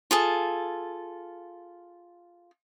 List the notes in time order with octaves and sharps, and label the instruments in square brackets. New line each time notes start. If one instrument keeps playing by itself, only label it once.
[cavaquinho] F4 G#4 A4